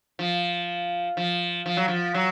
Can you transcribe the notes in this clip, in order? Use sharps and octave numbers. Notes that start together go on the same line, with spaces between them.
F3
F3
F3
F#3
F3
F#3